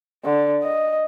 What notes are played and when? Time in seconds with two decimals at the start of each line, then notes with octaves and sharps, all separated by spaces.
0.25 D3
0.63 D#5